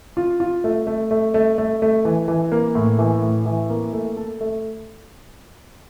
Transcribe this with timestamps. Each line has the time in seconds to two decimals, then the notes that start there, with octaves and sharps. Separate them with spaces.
0.17 F4
0.40 F4
0.64 A3
0.87 A3
1.11 A3
1.34 A3
1.58 A3
1.82 A3
2.05 E3
2.28 E3
2.52 A#3
2.75 A2
2.99 E3
3.22 A2
3.46 E3
3.70 A#3
3.93 A3
4.17 A4
4.41 A3